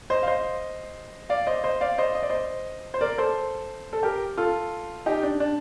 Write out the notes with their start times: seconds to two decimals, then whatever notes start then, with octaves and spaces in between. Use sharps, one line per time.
0.10 C5 D#5
0.23 F5
0.27 C5 D#5
1.29 D5 F5
1.47 C5 D#5
1.64 C5 D#5
1.81 D5 F5
1.98 C5 D#5
2.15 D#5
2.22 D5
2.29 C5 D#5
2.94 C5
3.01 A#4 D5
3.18 A4 C5
3.93 A4
4.03 G4 A#4
4.37 F4 A4
5.06 D#4 G4
5.23 D4
5.40 D4